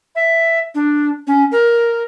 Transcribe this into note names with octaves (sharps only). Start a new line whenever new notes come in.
E5
D4
C#4
A#4